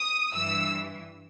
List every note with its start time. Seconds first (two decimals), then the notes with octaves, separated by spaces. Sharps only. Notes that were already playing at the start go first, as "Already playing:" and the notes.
Already playing: D#6
0.34 G2 E3 E6